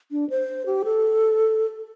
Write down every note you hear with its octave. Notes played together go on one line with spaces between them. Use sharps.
D4
C5
G4
A4